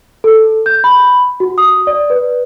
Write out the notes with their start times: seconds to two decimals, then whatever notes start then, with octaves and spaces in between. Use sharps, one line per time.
0.24 A4
0.66 G6
0.84 B5
1.40 F#4
1.58 D#6
1.87 D5
2.10 B4